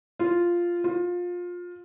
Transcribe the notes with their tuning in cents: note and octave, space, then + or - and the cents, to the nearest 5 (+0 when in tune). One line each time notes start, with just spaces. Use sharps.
F4 -5
F4 +20